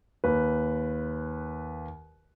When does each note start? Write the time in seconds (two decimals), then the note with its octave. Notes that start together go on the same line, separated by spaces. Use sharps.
0.24 D#2 B4